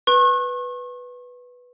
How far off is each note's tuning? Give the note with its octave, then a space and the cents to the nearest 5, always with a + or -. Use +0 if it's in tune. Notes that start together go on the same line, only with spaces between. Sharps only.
B4 +0 C#6 -40